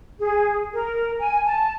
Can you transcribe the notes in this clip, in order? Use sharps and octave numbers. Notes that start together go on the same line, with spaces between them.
G#4
A#4
G#5
A5